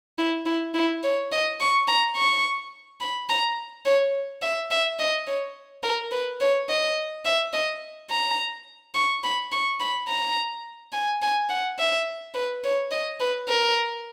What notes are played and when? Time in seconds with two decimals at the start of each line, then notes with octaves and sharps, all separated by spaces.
0.18 E4
0.46 E4
0.74 E4
1.03 C#5
1.32 D#5
1.60 C#6
1.87 A#5
2.16 C#6
3.00 B5
3.29 A#5
3.85 C#5
4.42 E5
4.71 E5
4.99 D#5
5.27 C#5
5.83 A#4
6.11 B4
6.40 C#5
6.69 D#5
7.25 E5
7.53 D#5
8.10 A#5
8.94 C#6
9.24 B5
9.52 C#6
9.80 B5
10.08 A#5
10.93 G#5
11.22 G#5
11.49 F#5
11.79 E5
12.34 B4
12.63 C#5
12.91 D#5
13.20 B4
13.48 A#4